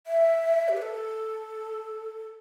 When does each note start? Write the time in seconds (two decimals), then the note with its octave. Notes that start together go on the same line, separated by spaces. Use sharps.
0.07 E5
0.69 G4
0.77 B4
0.82 A4